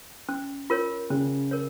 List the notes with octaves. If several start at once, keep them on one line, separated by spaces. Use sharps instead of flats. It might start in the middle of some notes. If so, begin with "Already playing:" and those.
C#4
F4 A#4 C#5
C#3 C#4
A#4 C#5